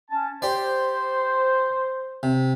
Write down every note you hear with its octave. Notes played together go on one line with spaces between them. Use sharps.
C#4 A5
G4 C5 D5
C3